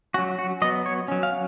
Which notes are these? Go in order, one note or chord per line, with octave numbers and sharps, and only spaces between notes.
F#3 C#4 F#4
F#4
F#3 B3 D#5
C#5
F#3 C#4
F5